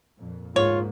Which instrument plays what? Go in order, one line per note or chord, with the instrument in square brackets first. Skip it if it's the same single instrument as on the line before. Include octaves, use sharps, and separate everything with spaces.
[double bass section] F2 A#2
[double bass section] D2 G#2 A#3 [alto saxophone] F4 [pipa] C#5